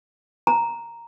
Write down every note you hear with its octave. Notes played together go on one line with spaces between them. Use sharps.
A#5